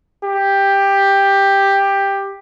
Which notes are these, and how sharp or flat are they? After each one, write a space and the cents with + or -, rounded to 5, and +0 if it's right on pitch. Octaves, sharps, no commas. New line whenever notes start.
G4 +10